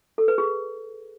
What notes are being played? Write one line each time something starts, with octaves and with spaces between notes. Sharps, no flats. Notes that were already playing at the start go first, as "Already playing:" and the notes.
A4
B4
G#4